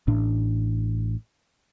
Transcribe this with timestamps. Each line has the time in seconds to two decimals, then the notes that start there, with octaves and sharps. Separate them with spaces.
0.07 A1 A2 D4